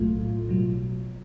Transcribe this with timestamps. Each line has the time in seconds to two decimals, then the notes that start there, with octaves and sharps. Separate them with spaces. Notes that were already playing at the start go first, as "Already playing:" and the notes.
Already playing: B1 A2 F#3 A3 F4
0.49 B2 F#3